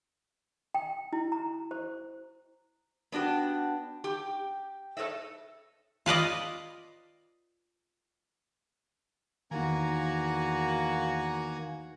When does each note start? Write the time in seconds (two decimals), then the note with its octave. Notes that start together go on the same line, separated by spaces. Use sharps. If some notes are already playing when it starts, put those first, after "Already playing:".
0.74 G5
1.13 E4
1.32 A#5
1.71 C5
3.12 B3 D4 F#4 G4
4.04 G4
4.97 A4 B4 C#5 D#5 E5
6.06 F4 B4 D5 D#5
9.51 E2 D#3 A#3 D#4 F#4 G#5 A#5